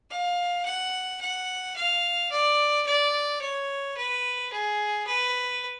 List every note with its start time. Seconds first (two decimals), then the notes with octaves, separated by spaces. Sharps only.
0.10 F5
0.65 F#5
1.21 F#5
1.76 F5
2.31 D5
2.86 D5
3.41 C#5
3.97 B4
4.52 G#4
5.07 B4